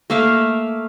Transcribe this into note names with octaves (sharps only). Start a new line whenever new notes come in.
A3 A#3 E5 F5